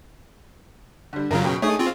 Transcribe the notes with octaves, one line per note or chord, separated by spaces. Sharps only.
D3 G3
F#2 C#3 F#3 F4 A#4
B2 G5
A3 D#4 G#4 C#5 D#6
C4 F4